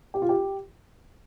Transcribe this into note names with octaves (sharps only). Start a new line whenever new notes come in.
G4
F4
G4